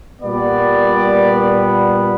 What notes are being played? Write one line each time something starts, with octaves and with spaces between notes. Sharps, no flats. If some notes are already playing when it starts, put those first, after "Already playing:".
A#2 G3 B3 D5